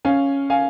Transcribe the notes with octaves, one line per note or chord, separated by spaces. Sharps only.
C#4 F5 G#5
F5 G#5